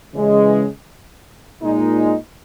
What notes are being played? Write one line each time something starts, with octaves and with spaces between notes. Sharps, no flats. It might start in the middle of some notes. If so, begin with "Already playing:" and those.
C#3 E3 G#3
A#2 G#3 D#4